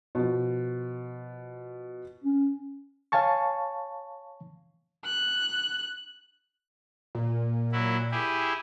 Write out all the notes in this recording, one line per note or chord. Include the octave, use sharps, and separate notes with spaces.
B2 F3
C#4
C#5 F5 G#5 A5 C#6
F#6
A#2
F#3 E4
E4 G4 G#4